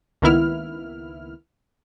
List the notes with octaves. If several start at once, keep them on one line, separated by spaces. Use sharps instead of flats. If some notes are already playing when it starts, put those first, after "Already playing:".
C#2 D#3 A#3 B3 E4 F6